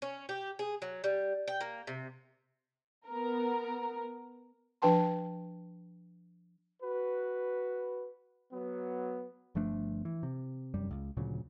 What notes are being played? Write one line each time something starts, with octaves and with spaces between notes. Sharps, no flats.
C#4
G4
G#4
F#3
G3
G5
A#3
C3
B3 A#4
F3 D4 B4 G5 A5 C6
F#4 B4
F#3 B3
G1 F3 A3 D4
E3
C3
F1 F#2 G3
C#2
D2 A#2 C#3 F#3